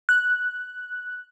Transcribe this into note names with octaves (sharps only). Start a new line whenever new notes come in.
F#6